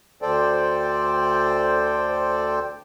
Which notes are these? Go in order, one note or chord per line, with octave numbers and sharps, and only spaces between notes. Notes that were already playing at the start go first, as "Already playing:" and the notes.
D2 A4 C5 D5 G5